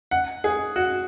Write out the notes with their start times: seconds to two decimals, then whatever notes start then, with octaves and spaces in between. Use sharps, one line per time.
0.11 F#5
0.44 G#4
0.76 F#4